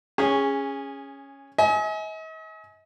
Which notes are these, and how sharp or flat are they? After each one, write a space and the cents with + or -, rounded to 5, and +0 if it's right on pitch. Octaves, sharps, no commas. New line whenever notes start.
C#4 +0 G#4 -15
D#5 +45 G#5 +20